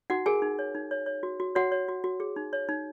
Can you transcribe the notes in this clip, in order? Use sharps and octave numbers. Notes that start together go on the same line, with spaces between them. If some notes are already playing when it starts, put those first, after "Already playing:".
D#4 F#4 F#5
G#4 A#4 G#5
D#4
C#5
D#4
C#5
C#5
F#4
F#4
F#4 C#5 F#5
C#5
F#4
F#4
G#4
D#4
C#5
D#4